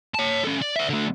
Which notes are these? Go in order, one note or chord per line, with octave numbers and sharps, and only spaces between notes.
C#5 A5
C#4 A4
D5
D5 E5
D3 A3